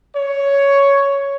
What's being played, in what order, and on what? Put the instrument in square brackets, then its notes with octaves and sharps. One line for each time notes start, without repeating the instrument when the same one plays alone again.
[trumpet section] C#5